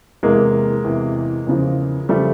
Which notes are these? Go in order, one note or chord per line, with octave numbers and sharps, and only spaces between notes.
E2 C3 E3 G#3 A#3
E2 C3 E3
E2 C#3 F3
C#3 F3 G3 A3